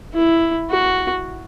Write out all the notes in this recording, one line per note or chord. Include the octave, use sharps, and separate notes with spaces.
E4
F#4